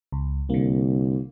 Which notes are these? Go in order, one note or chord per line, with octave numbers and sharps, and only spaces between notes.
C#2
C2 D3 A#3